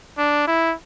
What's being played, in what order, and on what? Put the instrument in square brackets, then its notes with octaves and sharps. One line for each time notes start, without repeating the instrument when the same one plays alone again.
[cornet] D4
E4